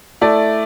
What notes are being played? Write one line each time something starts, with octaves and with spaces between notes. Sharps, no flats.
A3 E4 D5